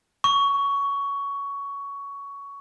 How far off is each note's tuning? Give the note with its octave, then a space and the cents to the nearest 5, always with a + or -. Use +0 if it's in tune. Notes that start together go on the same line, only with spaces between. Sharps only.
C#6 +15